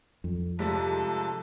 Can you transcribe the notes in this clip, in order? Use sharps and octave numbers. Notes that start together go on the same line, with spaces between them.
F2
G#2 C3 F3 G3 A4